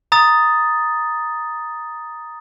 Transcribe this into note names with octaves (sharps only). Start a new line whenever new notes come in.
A#5 D#6 A6